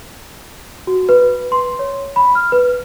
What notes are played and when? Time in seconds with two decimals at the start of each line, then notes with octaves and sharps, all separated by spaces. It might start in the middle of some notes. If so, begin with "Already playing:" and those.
0.87 F#4
1.09 B4
1.52 C6
1.79 C#5
2.16 B5
2.35 F6
2.52 B4